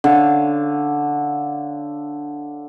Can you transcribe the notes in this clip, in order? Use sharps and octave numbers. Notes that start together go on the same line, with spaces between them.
D3 C#5 F5